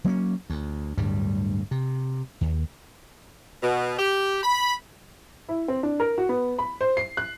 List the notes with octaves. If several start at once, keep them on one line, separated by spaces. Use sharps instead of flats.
F#3 A#3 C4 C#4
D2
D1 D2 G2 G3
C3
D#2
B2
G4
B5
E4
C4
D4
A#4
F#4
B3
B5
C5
C7
F#6